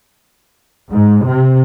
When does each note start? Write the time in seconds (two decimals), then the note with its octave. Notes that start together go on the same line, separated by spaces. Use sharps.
0.91 G#2
1.25 C3